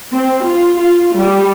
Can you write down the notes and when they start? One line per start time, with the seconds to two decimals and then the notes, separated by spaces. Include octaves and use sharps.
0.12 C4
0.44 F4
0.80 F4
1.16 G3